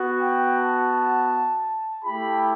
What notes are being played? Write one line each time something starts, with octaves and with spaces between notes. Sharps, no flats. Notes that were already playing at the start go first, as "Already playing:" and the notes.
Already playing: B3 F#4
G5
A5
A3 E4 G4 B5